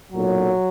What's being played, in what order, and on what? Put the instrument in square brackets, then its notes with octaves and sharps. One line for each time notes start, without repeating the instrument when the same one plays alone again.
[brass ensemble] B1 A#2 F#3